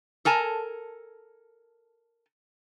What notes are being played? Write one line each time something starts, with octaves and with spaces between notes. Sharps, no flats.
A4 A#4 G#5 A5